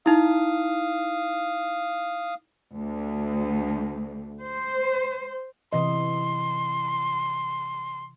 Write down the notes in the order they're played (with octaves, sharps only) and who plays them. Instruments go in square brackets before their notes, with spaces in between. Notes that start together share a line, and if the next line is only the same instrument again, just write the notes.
[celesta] D#4 E4 [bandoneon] F5 D#6
[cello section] D2
C5
[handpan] C3 E3 D#5 [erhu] C6